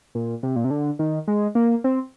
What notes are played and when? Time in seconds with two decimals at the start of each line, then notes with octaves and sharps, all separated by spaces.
0.15 A#2
0.43 C3
0.56 A#2
0.64 C3
0.71 D3
0.99 D#3
1.28 G#3
1.55 A#3
1.84 C4